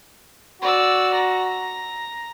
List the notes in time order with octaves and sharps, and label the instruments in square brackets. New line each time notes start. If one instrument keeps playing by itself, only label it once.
[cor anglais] F#4 [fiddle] D5 E6
[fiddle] A#5